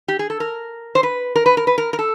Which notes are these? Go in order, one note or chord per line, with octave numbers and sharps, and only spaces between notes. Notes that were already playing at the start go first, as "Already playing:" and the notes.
G4
G#4
A4
A#4
C5
B4
A#4
B4
A#4
B4
A#4
A#4
A4